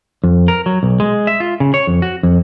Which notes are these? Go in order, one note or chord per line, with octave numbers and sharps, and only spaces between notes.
F2
A#4
F#3
B1
G#3
E5
F4
C#3
C#5
F2
F#4
F2